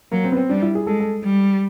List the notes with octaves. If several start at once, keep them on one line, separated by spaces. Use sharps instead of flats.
F#3 A#3
C4
B3
C4
G3 D4
E4
G#4
G#3 A4
A4
G3